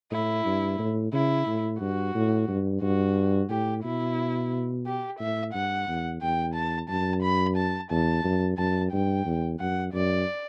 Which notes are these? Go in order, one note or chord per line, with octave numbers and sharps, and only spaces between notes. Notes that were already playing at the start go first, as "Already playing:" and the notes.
A2 E4
G2
A2
C#3 E4
A2
G2 F#4
A2
G2
G2 F#4
A2 G4
B2 E4
G4
A2 E5
G2 F#5
E2
E2 G5
A5
F#2 A5
B5
A5
E2 A5
F#2
F#2 A5
G2 G5
E2
F#2 F#5
F#2 D5